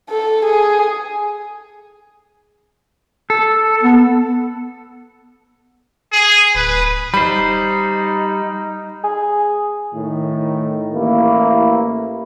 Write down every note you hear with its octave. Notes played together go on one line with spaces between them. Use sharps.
A4
G#4
A4
B3
G#4
D1 B4
G3 D#4 C5 B5
G#4
A2 D#3
A1 A#3 E4